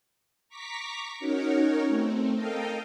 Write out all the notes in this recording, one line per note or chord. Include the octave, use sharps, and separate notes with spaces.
A#5 C#6 D6 B6
C#4 D#4 F#4 A#4 C#5
A3 C4
A4 A#4 D#5 F5 G5